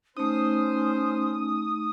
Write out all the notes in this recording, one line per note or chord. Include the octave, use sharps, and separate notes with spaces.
A3 C#4 D#4 C5 D#6